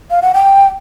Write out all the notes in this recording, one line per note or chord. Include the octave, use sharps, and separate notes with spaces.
F5
F#5
G5